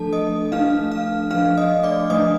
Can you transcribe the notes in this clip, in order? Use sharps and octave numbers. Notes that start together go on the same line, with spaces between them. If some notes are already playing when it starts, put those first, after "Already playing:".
Already playing: F3 A3 D4 A4 A5
D#5 D#6
F3 A3 D4 F5 F6
F5 F6
F3 A3 D4 F5 F6
D#5 D#6
D5 D6
F3 A3 D4 D#5 D#6